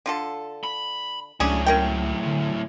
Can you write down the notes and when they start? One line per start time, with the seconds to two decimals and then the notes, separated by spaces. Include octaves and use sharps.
0.06 D3 F4 A4
0.64 B5
1.40 C#2 A2 F#3 C#4 D4 G#4
1.66 C#4 A#4 G5
2.26 D3